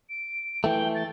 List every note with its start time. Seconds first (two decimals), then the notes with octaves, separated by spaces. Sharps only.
0.09 D7
0.64 E3 A3 G5
0.95 A6